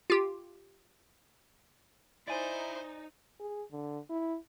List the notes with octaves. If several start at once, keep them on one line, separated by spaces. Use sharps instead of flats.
F4 G4
D#4 E4 C5 D5 G#5
G#4
D3
E4